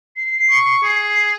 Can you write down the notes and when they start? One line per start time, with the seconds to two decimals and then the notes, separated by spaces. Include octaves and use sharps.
0.16 C7
0.50 C#6
0.83 G#4 C7